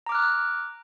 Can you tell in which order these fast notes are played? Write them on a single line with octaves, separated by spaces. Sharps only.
A#5 D6 F6 F#6